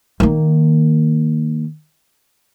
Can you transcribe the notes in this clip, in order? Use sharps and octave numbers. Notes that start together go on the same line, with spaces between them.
D#3 A#3